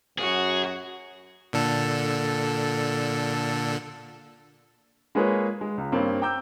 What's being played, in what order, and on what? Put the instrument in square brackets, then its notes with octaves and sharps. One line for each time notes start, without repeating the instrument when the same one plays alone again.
[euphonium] F#2 [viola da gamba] F#4 [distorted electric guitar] G#4
[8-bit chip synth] A#2 D3 A4
[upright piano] G#3 A#3 F4 G#4 B4 C#5
G#3
C#2
G2 A#3 C4 C#4
G5 A#5 D6 E6 G6